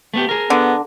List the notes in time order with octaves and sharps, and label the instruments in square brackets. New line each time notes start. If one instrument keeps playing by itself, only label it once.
[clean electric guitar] A3 B3 G4
G#4 A#4
[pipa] D3 [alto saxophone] B3